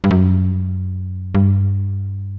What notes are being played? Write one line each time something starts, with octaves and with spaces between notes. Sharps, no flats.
G2
F#2
G2